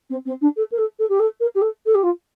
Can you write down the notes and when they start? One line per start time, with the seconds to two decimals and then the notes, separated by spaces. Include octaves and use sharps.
0.09 C4
0.25 C4
0.41 D4
0.56 A4
0.71 A#4
0.78 A4
0.99 A4
1.09 G4
1.19 A4
1.40 A#4
1.55 G4
1.61 A4
1.86 A4
1.94 G4
2.03 F4